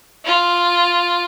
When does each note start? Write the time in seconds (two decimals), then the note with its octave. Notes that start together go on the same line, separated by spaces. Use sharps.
0.25 F4